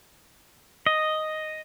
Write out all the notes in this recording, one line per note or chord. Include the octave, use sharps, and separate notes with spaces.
D#5